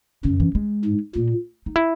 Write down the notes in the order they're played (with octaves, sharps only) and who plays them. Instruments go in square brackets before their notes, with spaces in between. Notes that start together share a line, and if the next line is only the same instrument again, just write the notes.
[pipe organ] F#2 [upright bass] C#3
[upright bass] E3
G#3
[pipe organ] G#2
[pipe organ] A#2 [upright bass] A#3
[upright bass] D#4
E4